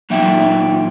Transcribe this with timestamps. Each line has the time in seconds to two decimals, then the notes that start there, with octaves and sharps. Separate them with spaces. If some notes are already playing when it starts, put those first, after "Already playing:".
0.10 A#2 F#3 D#4 E5 G5